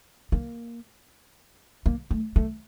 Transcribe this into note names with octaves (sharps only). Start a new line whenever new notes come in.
A#3
A#3
A3
A3